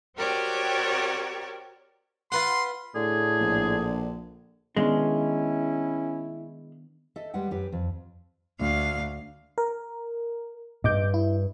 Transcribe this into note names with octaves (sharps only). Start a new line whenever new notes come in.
C4 F#4 G4 A#4 C#5 D5
F4 B4 F#5 C6
A2 D3 G#4
A#1
D#3 G#3 B3 C#4 D4 E4
A4 D#5 E5
G3 G#3 B4 F#5 G5
F#2 G4 B4
F2
D2 F5
A#4
G2 D#5 D6 G6
E4